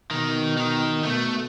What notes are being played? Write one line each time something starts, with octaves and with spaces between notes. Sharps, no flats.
B2 D#3
D#3
B2 A3